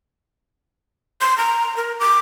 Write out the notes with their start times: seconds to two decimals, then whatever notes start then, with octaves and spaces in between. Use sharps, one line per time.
1.21 C6
1.38 A#5
1.77 A#4
2.00 D6